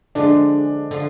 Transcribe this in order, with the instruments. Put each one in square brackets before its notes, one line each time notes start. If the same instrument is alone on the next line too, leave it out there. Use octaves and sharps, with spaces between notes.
[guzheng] D3 F3 G#3 [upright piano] D4
[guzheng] D3 F3